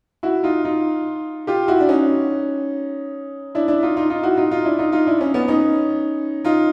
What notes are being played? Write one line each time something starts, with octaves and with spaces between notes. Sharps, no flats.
E4 F#4
D#4 F4
D#4 F4
F4 G4
E4 F#4
D4
C#4 D#4
D4 E4
D4 E4
D#4 F4
D#4 F4
D#4 F4
E4 F#4
D#4 F4
D#4 F4
D4 E4
D#4 F4
D#4 F4
D4 E4
C#4 D#4
B3 C#4
C#4 D#4
D#4 F4